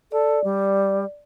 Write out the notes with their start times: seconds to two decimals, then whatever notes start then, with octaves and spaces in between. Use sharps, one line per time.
0.12 A4 D5
0.44 G3